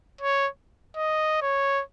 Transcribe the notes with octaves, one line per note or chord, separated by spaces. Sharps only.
C#5
D#5
C#5